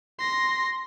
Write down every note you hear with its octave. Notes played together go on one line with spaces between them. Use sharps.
C6 A#6